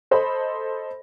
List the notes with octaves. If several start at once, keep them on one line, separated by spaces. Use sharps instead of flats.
A4 C5 D#5 B5